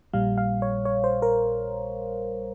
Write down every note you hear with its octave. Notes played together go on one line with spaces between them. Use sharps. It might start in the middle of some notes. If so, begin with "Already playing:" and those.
A#1 A#2 G3 F5
F5
C#5
C#5
C5
A#4